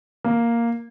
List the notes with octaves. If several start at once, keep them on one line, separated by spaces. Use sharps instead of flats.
A#3